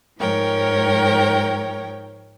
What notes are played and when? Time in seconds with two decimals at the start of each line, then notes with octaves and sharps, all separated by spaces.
0.19 G#2 F3 A#4 C#5 G5